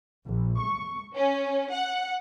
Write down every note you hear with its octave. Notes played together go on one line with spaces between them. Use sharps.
A#1
C#6
C#4
F#5